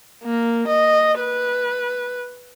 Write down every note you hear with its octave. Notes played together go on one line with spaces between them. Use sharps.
A#3
D#5
B4